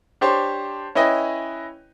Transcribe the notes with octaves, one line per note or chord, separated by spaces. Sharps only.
D4 G4 C5 C#5 A5 C6
C#4 E4 B4 D#5 G5